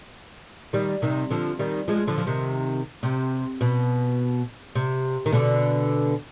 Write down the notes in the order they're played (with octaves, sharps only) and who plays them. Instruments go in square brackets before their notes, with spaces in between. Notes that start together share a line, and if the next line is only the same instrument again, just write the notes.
[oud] D#3 G3
C3 D#3
D3 F3
D#3 G3
F3 G#3
D3 F3
F3
C3 D#3
C3
B2
C3
D#3
B2 D3